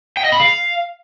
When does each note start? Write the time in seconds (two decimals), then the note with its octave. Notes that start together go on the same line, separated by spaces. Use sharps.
0.17 G5
0.25 D#5
0.32 B5
0.40 F5